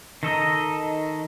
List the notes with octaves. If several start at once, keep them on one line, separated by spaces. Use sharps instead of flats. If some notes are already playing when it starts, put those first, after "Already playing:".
D#3 A4 D#5 A#5